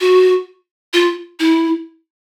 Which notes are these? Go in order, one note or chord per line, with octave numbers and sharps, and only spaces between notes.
F#4
F4
E4